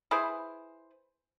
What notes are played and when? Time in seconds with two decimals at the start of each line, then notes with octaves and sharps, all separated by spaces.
0.11 E4 G#4 B4 C5